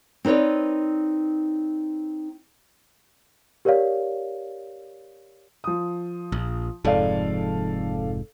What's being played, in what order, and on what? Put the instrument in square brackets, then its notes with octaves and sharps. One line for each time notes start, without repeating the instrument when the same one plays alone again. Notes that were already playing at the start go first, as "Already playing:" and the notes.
[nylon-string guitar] C4 D#4 B4 C#5 D5
[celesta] G4 A#4 C#5 D5 F5
[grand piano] F3 D#6
[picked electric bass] A#1
[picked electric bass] F1 F2 G#2 [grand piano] A4 D5 F5